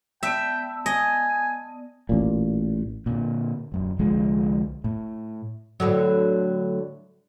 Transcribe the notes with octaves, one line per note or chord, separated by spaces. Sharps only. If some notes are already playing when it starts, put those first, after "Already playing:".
B3 D5 E5 G5 A5
D#5 G#5
A1 A#2
A#2 D3
D1 F#2
C2 D3 F3 G#3
A2
A2 D3 F#3